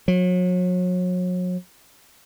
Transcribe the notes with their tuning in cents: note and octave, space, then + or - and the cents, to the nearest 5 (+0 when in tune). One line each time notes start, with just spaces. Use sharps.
F#3 -35